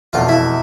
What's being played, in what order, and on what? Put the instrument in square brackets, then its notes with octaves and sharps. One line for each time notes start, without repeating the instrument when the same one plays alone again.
[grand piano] F1 E2 B2 A3 [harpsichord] F4
[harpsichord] E4